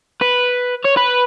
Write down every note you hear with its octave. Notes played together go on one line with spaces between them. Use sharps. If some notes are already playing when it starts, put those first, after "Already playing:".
B4
C#5
B4